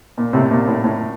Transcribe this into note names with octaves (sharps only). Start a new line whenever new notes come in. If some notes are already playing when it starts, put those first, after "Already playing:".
A#2
A2 C3
A#2
A2
A2